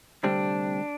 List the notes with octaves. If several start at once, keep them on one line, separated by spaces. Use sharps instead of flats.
D2 C3 G3 C4 D4